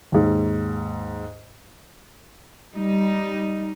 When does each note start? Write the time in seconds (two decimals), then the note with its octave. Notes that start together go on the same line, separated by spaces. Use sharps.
0.12 D#2 G#2
2.75 G3 D#4